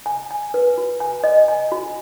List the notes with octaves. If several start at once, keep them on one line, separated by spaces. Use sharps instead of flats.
G#5
G#5
B4
F#4
G#5
D#5
G#5
F#4